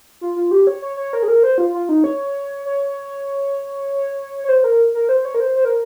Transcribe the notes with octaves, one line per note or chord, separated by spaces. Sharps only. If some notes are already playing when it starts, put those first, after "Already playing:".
F4
F4
G4
C#5
C#5
C#5
A#4
G#4
A#4
C5
F4
F4
D#4
C#5
C#5
C#5
C5
A#4
A#4
C5
C#5
A#4
C5
C5
A#4